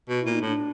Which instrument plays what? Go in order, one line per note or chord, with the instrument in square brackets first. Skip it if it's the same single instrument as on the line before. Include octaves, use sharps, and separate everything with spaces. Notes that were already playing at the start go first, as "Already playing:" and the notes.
[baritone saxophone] B2 [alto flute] F#4
[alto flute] E4
[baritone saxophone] A#2
[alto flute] D#4
[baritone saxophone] A2 [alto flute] D4